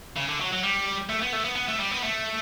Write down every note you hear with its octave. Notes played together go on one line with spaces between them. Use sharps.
C#3
D3
F#3
F#3
G3
A3
B3
A3
B3
B3
A3
G3
B3
A3